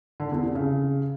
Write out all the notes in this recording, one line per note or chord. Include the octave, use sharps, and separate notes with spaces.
D3
E2
C3
C#3